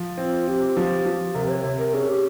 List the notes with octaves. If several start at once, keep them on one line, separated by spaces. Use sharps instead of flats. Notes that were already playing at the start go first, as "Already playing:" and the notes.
Already playing: F3
C4 F4
C4 G4
F3
F3
C3 A#4
C#5
C3
A#4
C#4 G#4
G4